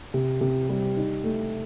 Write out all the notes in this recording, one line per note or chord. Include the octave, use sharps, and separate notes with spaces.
C3
C3
G3
D#4
A3